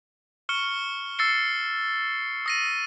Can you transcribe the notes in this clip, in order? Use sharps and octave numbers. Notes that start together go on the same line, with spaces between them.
C#6 F6 C#7 G7
E6 A6 C7 C#7 G7
D#6 A#6 D#7